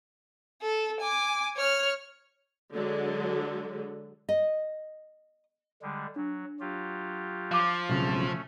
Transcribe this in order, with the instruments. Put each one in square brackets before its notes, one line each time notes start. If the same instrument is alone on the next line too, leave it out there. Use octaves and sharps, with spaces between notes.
[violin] A4
G#5 D6
C#5 F6
[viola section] D3 F#3 G#3
[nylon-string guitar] D#5
[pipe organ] D3 G3 G#3
[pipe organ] F#3 [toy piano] D4
[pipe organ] F#3 F4 G4
[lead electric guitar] F3 [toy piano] F5 D6
[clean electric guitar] B1 C#3 [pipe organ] A3 C#4 [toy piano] F#4